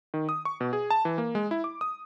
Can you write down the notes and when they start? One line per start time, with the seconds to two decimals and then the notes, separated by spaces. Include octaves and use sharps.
0.14 D#3
0.29 D#6
0.45 C#6
0.61 B2
0.73 G#4
0.90 A5
1.05 E3
1.18 A#3
1.35 G#3
1.51 E4
1.64 D6
1.81 D#6